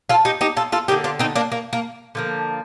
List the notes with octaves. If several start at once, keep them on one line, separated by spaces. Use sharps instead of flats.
F4 A4
D#4 G4
D#4 G4
F4 A4
F4 A4
D3 G3 A#3 D#4 G4
D4 F4
C4 D#4
A#3 D4
A#3
A#3
D3 F3 A#3